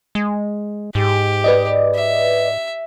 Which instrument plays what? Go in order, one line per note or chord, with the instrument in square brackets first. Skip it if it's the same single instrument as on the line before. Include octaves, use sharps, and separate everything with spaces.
[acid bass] G#3
[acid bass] G#2 [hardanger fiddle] G4
[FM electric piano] B4 D5 D#5
[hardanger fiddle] E5